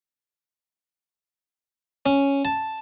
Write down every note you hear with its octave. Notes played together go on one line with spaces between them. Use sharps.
C#4
A5